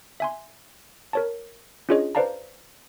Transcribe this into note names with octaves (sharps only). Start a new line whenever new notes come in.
E5 G#5 C6
A#4 C#5 A5
C#4 D4 F4 G#4 C#5 D#5
B4 C5 D5 F5 A5 A#5